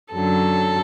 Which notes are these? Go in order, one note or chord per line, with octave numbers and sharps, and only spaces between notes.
F#2 D3 F#3 A4